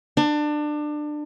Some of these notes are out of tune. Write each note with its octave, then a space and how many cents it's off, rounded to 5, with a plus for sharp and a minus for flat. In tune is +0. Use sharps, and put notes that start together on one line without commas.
D4 +25